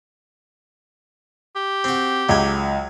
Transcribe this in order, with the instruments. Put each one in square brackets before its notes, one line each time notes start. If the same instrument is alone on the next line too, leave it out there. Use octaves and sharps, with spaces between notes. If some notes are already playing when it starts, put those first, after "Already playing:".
[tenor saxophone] G4
[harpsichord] C4 F#4
[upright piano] C#2 [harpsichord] F#3 G#5